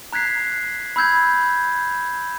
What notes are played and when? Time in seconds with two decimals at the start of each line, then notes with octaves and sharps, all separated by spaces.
0.13 A#5 F#6 G#6 B6 C7
0.96 B5 E6 G6 G#6